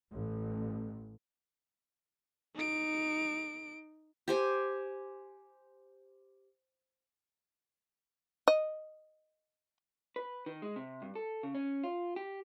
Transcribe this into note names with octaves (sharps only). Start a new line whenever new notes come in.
A1
D#4 D7
G4 C5 G#5
D#5
B4
D#3
G#3
C3
G2
A4
C#3
C#4
F4
G4